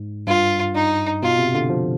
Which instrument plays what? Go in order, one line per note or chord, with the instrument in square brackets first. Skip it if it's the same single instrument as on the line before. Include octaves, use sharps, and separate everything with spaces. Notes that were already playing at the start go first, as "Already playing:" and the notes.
Already playing: [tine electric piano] G#2
[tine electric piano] G2 [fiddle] F4
[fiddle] D#4
[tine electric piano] B2 [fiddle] F4
[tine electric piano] C3
D3
F3